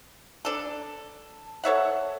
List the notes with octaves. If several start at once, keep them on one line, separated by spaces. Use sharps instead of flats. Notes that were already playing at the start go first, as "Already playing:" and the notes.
D4 A4
A4 C#5 E5 F#5